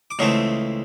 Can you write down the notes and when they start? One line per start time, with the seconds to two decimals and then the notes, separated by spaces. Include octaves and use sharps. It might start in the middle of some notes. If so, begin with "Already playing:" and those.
0.11 D6
0.19 C#2 C#3 E3 A3 C4 C#6